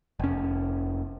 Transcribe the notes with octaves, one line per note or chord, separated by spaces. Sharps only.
F1 C#4